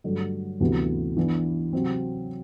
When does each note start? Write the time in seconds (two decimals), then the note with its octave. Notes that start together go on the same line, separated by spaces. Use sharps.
0.04 G2 D3 F#3 A3
0.60 D2 C3 E3 B3
1.17 E3 B3 D4
1.73 C3 F#3 C4